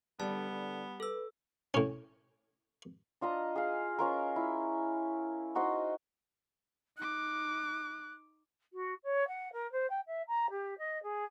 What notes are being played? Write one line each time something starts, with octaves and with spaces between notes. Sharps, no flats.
D3 G3 B3 A5
D3
A4 B4 E6
A2 C#4
D4 F4 D#5 A#5
G#4 D#5 F5
C#4 F4 A#4
E4
D#4 F#4 C5 D#5
D#4 D6 F#6
F#4
C#5
F#5
A#4
C5
G5
E5
A#5
G4
D#5
G#4